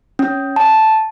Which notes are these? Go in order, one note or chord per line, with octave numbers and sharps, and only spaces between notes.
C#4
A5